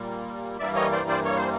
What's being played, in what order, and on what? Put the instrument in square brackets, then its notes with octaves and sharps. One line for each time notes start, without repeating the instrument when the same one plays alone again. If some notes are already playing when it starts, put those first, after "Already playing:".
Already playing: [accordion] A#2 G3 A#3
G2 E3 G3 A#3 D5 E5
C#5 D#5
C5 D5
C5 D5
C#5
C5